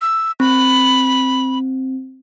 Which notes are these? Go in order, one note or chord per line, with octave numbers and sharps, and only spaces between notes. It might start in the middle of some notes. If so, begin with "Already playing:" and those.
E6
C4 B5